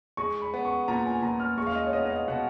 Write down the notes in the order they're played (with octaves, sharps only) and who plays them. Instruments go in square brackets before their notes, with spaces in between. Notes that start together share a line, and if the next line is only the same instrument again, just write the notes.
[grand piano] G#3 [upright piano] C#6
[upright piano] B5
[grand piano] B3
[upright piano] C#6
[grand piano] A#2 [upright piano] A#5
[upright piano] G#5
[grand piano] A#2 [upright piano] A#5
[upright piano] F6
[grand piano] G#3 [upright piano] C#6
[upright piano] F5
D#5
C#5
[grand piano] B3 [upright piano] D#5
[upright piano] D#5
F5
[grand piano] B2 [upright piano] F#5